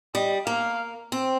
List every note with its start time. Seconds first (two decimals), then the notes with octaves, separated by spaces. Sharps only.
0.14 G3 D#5
0.47 A#3 F5
1.12 C4